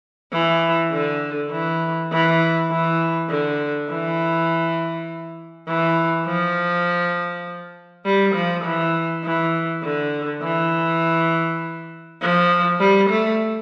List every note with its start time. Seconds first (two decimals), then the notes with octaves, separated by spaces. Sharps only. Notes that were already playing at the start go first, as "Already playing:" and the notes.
0.33 E3
0.92 D3
1.52 E3
2.11 E3
2.71 E3
3.30 D3
3.89 E3
5.67 E3
6.26 F3
8.05 G3
8.35 F3
8.64 E3
9.24 E3
9.83 D3
10.43 E3
12.21 F3
12.80 G3
13.10 A3